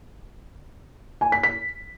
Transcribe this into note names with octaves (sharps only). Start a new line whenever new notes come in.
G#5
B6
B6